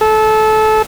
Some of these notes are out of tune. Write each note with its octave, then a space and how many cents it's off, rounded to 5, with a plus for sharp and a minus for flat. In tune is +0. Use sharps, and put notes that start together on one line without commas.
A4 -20